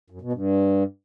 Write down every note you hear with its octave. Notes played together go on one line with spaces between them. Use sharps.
F#2
B2
G2